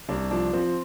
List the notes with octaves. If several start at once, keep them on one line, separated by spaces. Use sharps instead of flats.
C2 D4
F3 D4
F3 C4